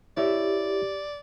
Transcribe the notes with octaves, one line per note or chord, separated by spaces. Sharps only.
E4 G4 C#5 D5 E5